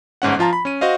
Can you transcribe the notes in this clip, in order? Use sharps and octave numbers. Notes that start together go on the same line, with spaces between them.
G1 G#2 C#4 F#5
F3 F4 A5 A#5
B5
C#4 D#7
F#4 C5 D#5 F5